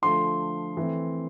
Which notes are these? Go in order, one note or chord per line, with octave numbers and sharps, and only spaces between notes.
D3 F3 A3 C6
E3 A3 C4